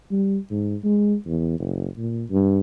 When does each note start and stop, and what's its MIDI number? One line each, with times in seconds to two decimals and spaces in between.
0.11 0.38 55
0.51 0.76 44
0.84 1.16 56
1.26 1.56 40
1.59 1.87 30
1.98 2.24 46
2.31 2.60 43